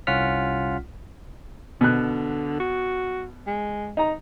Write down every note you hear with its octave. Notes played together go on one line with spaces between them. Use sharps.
C2 C#4 F4 F#5 F6 B6
B2 D3 F#6
F#4
G#3
D#4 A#5